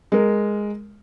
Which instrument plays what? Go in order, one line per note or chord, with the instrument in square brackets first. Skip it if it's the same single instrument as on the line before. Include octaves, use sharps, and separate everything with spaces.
[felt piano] G#3 A#4